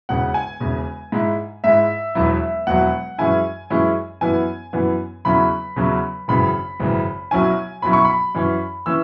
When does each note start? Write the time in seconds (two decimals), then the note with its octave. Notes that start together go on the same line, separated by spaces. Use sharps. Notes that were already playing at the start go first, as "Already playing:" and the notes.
0.09 E1 E2 C#3 F#5
0.34 G#5
0.60 E1 E2 C#3
1.12 G#2 G#3 E4
1.64 G#2 G#3 E4 E5
2.15 E1 E2 B2 F#3 E4
2.67 E1 E2 B2 F#3 E4 F#5
3.18 F#2 E3 G#3 C#4 E4 G#5
3.70 F#2 E3 G#3 C#4 E4
4.21 F#2 E3 B3 E4 G#5
4.73 F#2 E3 B3 E4
5.25 E2 C#3 F#3 C#4 E4 B5
5.76 E2 C#3 F#3 C#4 E4
6.28 G#1 F#2 C#3 E3 B5
6.80 G#1 F#2 C#3 E3
7.31 B1 B2 F#3 C#4 E4 G#5
7.82 B1 B2 F#3 C#4 E4 B5
7.93 C#6
8.05 B5
8.35 F#2 E3 C#4
8.86 E3 C#4 E6